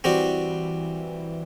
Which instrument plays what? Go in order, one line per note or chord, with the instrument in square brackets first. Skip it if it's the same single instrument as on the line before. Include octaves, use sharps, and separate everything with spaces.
[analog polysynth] E3 [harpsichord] G3 C4 F#4